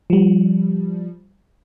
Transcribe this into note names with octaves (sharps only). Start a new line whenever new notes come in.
F3 G3